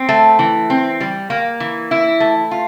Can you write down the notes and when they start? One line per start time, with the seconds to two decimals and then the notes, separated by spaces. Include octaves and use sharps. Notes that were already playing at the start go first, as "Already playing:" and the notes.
Already playing: C4
0.09 A3
0.39 E3
0.70 C4
1.00 G3
1.30 A#3
1.60 E3
1.91 E4
2.20 A3
2.51 F4